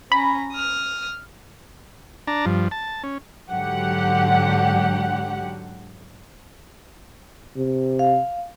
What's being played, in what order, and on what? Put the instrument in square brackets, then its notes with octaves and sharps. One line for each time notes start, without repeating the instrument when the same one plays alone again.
[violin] C#4 A#5 [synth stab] B5
[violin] D#6 F6
[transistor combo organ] D4 A5 A#5
G2 F3
A5
C#4
[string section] G#2 D3 F#3 G4 F#5
[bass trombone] C3
[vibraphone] F5